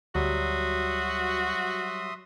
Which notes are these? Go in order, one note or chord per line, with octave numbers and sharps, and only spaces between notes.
D2 F#3 G3 F#4 E5 C6 D#6